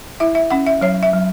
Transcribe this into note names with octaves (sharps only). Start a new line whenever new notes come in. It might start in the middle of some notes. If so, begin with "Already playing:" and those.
E4 E5
E5
C#4 F#5
E5
F#3 C#5
E5
F#3